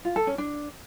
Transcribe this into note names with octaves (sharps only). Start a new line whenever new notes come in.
F4
A4
C#4
D4